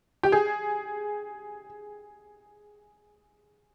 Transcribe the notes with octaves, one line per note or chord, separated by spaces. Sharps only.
G4
G#4